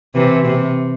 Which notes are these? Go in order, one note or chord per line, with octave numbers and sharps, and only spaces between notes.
C3 E3
C3